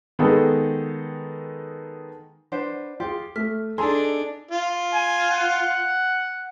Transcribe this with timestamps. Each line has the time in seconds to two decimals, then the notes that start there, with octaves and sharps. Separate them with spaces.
0.19 D#3 G#3 B3 D#4 G#4 A4
2.52 D4 B4 C5 F#5
3.00 F4 G4 G#4
3.36 A3 F6 B6
3.78 D4 D#4 G#4 A4 G#5 A#5 C6
4.51 F4
4.94 G#5
5.31 F#5